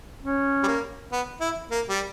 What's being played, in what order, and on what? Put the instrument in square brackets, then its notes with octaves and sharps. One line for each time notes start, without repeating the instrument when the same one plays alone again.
[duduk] C#4
[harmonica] G3
A#3
B3
E4
A#3
G3